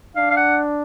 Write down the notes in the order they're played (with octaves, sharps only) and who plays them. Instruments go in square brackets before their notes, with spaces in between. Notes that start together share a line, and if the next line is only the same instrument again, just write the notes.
[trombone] D4 [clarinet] F5
[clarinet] F5
F#5